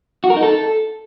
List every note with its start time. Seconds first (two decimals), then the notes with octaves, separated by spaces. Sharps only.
0.24 F#4
0.30 A#4
0.36 D#4
0.43 A4